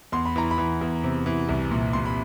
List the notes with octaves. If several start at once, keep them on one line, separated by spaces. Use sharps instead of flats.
E2 C6
B5
E3 A#5
B5
E3
E2
C3
E3
C2
A#2
A#2 C6
B5